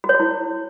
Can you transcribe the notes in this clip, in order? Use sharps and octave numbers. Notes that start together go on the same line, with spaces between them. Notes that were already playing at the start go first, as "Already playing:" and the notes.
F#4
C#5
F#4
E4